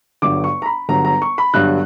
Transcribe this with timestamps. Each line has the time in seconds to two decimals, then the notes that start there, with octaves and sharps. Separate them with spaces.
0.22 G1 G2 F#3 D6
0.44 C#6
0.62 A#5
0.66 B5
0.89 G1 G2 F#3 A#5
1.05 A#5
1.22 C#6
1.38 B5
1.54 G1 G2 F#3 F#6